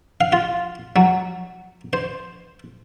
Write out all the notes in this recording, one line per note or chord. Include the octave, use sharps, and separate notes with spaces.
F5
F4
F#3
C5